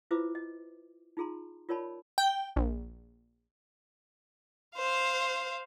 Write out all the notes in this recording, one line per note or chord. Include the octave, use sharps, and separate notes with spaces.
E4 F4 B4 C5 E5 D6
D#5
D#4 F4 G#4 A#5 C6
F4 A#4 C#5 D5 A5 B5
G5
A#1
C5 F5